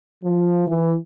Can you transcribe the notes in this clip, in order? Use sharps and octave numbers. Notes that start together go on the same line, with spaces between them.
F3
E3